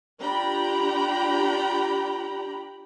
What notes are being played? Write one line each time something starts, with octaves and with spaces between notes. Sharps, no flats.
D4 F4 G4 G5 A#5 B5